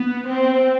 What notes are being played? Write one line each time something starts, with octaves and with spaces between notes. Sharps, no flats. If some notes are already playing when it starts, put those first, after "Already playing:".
Already playing: B3
C4